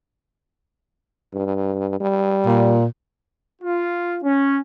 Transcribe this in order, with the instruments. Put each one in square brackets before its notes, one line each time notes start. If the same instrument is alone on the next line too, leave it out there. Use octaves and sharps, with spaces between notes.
[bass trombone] G2
G3
[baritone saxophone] A#2
[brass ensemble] F4
C#4